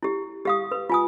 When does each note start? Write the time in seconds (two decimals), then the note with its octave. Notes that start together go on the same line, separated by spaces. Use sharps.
0.03 E4 G4
0.45 G4 F5 D#6
0.71 B4
0.90 F4 G#5 D#6